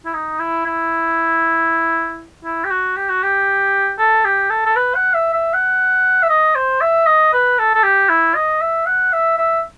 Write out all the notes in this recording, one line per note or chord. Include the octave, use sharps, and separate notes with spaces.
E4
D#4
E4
E4
E4
G4
F#4
G4
F#4
G4
A4
G4
A4
A4
B4
F#5
E5
E5
F#5
E5
D#5
C5
E5
D#5
B4
A4
A4
G4
E4
D#5
E5
F#5
E5
E5